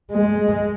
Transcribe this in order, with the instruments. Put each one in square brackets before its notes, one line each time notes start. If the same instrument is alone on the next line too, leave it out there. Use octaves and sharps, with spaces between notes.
[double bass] G#3